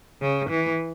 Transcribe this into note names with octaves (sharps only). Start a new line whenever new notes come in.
C#3
E3